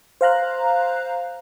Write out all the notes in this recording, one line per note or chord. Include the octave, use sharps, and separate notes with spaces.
C5 F5 A#5 F#6